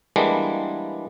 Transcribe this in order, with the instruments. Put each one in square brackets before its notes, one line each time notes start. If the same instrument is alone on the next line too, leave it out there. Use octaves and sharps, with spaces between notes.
[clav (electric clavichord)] E3 G3 G#3 A#3 B3 D4